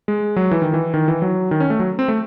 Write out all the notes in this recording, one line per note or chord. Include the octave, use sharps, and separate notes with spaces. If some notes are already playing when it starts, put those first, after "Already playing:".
G#3
F#3
E3
D#3
E3
D#3
E3
F#3
D#3
C#4
A3
F#3
C4
A3